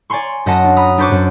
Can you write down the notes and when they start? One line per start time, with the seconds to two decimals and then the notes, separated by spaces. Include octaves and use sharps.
0.10 D5 G#5 A#5 C6 C#6
0.46 F#2 D#5 F#5 A5 A#6
0.64 D4
0.76 A#5 B5 D#6
0.98 D4 B4 C5 C#6 D6
1.11 F#2